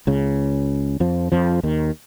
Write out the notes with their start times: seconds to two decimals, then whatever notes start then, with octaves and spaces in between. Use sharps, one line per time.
0.07 C#2 C#3
1.00 F2 F3
1.32 F2 F3
1.63 D#2 D#3